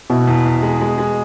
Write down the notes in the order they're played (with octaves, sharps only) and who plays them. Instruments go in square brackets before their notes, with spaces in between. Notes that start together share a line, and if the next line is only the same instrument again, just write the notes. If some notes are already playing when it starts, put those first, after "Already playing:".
[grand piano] B2 [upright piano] E4
[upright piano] E2
E2
G#3
G#3
G#3